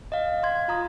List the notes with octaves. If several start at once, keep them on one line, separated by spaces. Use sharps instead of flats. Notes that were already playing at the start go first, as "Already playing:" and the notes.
D#5 F5
F5 C6 G#6
F4 A#5 D#6